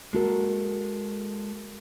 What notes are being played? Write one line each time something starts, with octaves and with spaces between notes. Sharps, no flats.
G#3 A#3 F#4 A4 A#4